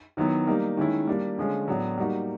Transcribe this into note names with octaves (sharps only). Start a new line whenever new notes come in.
D#3 F#3 B3 E4
G3 A#3 D#4
D#3 G#3 C#4 E4
G3 A#3 D4
D3 F3 G#3 C#4
A2 F#3 B3 D4 F#4
G3 A#3 D#4 F#4